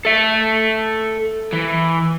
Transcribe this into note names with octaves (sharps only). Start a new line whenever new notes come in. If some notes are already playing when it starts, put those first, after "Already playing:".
A4 E5
E3